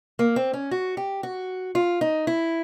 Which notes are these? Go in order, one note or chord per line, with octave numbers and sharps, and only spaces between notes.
A#3
C4
C#4
F#4
G4
F#4
F4
D#4
E4